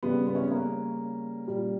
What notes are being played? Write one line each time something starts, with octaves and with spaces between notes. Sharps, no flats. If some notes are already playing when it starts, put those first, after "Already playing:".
C#3 G3 B3
B3
C#4
B3
A#3
A#2 G3